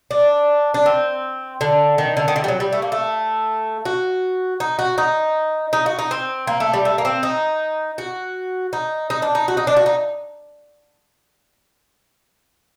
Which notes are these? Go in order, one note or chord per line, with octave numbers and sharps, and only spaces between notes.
D4
D4
C4
D3
D#3
D3
D#3
D3
G3
F#3
G3
A3
A#3
A3
F#4
D#4
F#4
D#4
D#4
F#4
D#4
C4
A#3
A3
G3
A3
A#3
C4
D#4
F#4
D#4
D#4
D4
D#4
F#4
D#4
D4
F#4
D#4